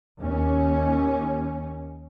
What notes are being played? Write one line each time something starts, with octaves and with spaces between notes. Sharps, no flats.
D#2 C#4